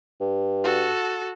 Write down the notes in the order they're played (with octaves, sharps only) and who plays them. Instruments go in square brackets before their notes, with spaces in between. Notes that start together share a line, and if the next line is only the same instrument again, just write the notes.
[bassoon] G2
[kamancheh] F#4 A4